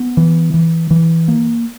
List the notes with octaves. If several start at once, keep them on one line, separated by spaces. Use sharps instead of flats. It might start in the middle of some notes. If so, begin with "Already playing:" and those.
Already playing: B3
E3
E3
E3
A#3